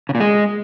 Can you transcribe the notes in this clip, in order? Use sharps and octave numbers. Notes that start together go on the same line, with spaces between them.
C#3
A#2
G#3